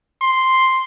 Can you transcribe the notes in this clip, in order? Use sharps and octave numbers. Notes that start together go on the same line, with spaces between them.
C6